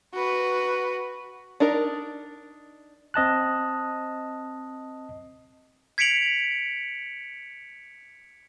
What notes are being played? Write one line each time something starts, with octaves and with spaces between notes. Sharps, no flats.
F#4 B4
D4 D#4 A#4
C4 D#5 A5 F#6
G#6 B6 C#7 D7 F7 F#7